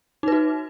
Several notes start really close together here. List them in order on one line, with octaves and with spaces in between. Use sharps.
D#4 B4 F#4